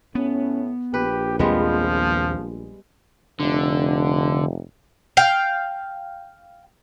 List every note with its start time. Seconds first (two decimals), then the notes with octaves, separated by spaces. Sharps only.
0.15 A2 B3 C#4
0.94 A#1 G4 B4
1.39 D#2 F3 G3 G#3 B3 C4
3.40 F1 D3
5.17 F5 G5